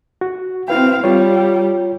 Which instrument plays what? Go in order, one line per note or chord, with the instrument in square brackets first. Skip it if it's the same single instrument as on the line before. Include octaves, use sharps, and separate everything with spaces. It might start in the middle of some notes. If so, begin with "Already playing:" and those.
[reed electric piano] F#4
[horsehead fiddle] C4 F5 [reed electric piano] E4 B4 G5
[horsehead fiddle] G3 [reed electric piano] F4 C#5